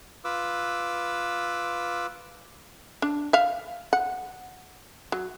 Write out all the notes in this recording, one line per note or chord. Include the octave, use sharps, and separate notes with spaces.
F4 B4 D6 E6
D4
E5 F5
F#5
F#3